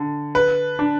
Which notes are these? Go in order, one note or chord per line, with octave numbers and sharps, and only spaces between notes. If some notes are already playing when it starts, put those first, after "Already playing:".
Already playing: D3
B4
D4